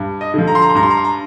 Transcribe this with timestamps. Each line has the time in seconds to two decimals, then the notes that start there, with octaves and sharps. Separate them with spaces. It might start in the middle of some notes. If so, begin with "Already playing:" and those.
Already playing: G2
0.21 D#5
0.34 D3 F3
0.47 A#5
0.55 C6
0.62 A#5
0.70 C6
0.75 G2 A#5
0.83 C6
0.90 A#5
0.97 C6
1.04 A#5